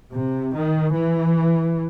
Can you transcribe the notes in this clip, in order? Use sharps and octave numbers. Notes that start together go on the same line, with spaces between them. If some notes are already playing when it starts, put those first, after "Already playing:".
C3
D#3
E3